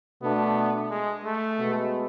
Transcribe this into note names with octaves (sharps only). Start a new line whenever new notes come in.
B2 A3 B3 D4
G#3
A3
B2 G#3 B3